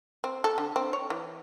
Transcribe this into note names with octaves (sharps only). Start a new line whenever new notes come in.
C4
A4
D3
C4
C#5
E3